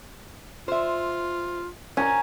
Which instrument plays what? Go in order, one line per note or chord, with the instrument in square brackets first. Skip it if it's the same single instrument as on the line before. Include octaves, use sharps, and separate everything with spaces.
[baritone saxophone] F4 [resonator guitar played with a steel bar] C5 E5
[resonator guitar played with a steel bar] C#4 [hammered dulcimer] G#5 A#5